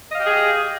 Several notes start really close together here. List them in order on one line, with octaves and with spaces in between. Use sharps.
D#5 F5 G4 G#4